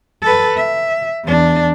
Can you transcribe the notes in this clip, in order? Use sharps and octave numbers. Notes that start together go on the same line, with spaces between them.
A4 B4
E5
E2 D4